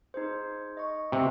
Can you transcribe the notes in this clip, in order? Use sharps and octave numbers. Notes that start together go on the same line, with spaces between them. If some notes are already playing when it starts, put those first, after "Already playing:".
D#4 G#4 C5
D#5 C#6
C3